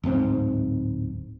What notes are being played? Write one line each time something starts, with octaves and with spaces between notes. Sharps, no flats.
D1 G#2 G#3 C4